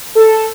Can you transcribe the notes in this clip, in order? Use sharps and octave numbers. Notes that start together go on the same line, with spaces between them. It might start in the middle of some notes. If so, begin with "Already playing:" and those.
A4